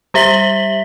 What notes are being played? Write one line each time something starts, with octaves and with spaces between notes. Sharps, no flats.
G3 G4 E5 B6 F#7 G7